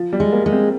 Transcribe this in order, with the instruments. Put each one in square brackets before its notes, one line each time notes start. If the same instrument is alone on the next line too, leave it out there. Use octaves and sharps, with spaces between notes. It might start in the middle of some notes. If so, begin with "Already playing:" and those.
Already playing: [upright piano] F3
G3
[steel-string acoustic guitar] G#3
[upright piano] A#3
[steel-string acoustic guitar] G#3
[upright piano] C4